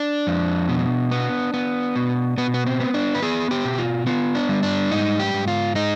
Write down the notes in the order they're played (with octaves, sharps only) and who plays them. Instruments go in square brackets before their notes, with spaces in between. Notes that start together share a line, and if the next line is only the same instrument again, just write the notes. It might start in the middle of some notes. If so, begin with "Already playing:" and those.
Already playing: [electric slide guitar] D4
F2
B2
B3
B3
B2
B2 B3
B3
C4
B3
D4
B4
B3 G#4
G4
B2
F4
B3 F4
D4
G3
D4
G#2 D#4
G4
G#2
F4
G#3 D#4